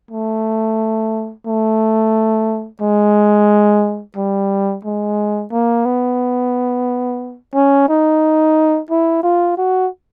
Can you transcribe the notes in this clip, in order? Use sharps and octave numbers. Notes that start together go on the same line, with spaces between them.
A3
A3
G#3
G3
G#3
A#3
B3
C#4
D#4
E4
F4
F#4